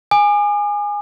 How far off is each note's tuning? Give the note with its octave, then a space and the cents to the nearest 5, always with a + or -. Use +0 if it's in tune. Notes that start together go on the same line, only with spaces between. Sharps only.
G#5 -10 D6 +45